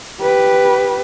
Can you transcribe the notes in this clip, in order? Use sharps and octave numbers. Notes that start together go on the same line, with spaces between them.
G4 B4